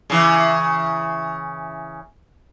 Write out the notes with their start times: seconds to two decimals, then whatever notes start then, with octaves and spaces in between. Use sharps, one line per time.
0.10 C#3 E3